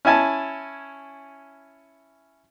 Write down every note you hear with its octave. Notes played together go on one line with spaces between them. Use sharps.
C#4 E4 G#5 A5